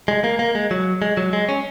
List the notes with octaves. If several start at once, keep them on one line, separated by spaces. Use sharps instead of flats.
G#3
A#3
A#3
G#3
F#3
G#3
F#3
G#3
C#4